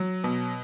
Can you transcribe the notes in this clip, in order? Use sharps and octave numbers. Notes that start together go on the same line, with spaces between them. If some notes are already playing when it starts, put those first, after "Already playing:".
Already playing: F#3
B2